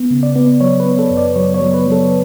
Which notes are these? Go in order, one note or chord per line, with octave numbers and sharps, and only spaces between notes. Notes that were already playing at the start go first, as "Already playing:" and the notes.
Already playing: B3
C#3
D5
B3
F#3 C#5
B4
B3
A4
F#2
D5
F#3 C#5
C#5
F#3
B4
F#3
A4